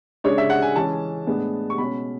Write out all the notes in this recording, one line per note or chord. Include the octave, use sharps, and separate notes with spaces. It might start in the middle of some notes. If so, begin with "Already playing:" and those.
C#3 G#3 D4 C#5
E5
F#5
G#5
E3 G#3 C#4 A5
A2 G#3 B3 D4
C#6
B2 G#3 C#4 B5